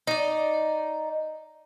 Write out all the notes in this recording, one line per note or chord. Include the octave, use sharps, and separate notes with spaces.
D#4 D5